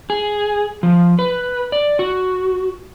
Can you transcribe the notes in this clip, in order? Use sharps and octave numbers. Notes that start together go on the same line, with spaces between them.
G#4
F3
B4
D5
F#4